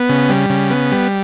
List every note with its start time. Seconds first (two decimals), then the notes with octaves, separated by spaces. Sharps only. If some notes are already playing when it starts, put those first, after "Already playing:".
Already playing: B3
0.09 C#3
0.29 G3
0.50 C#3
0.70 B3
0.91 G3